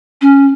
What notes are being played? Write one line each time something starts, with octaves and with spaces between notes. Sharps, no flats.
C#4